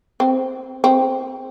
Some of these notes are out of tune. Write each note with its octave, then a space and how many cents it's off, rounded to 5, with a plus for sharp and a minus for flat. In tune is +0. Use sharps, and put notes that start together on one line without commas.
C4 -5
C4 +0